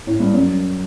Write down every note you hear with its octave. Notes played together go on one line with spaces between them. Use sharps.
A2
G2
F#2